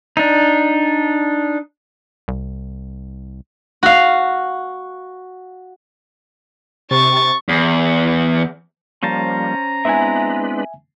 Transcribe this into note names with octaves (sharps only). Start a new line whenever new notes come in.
D4 D#4
C2
F#4 F5
C3 C#6 A6
E2
F3 G3 A#3 C#4 C5 A5 A#5
G#3 B3 C4 D4 E4 B4 E5 G#5